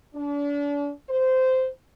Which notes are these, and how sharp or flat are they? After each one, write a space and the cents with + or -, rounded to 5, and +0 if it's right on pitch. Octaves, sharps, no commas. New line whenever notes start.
D4 -35
C5 -15